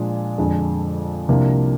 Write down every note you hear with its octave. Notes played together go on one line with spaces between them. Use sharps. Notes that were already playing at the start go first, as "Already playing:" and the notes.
Already playing: A#2 F3 G#3 D4 D5
F2 D3 G#3 D4
C2 C3 F3 A#3 D4